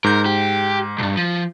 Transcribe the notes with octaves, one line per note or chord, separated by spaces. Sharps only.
G#2 A#4 G6
G4
B1 G2
F3